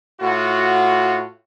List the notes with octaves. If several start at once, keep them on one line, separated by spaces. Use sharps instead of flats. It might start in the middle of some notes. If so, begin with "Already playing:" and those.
A2 F4 F#4